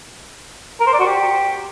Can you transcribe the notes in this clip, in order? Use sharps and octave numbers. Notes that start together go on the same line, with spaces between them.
A#4
C5
D5
F#4
G4